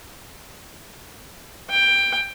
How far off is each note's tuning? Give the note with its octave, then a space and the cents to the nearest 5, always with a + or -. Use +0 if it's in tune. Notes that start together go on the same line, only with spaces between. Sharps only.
G5 +15